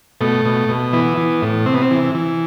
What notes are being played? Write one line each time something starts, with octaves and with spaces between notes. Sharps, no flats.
B2 A3
B2
B2
E3 B3
E3
A2
C3 C4
B3
C4
E3
E3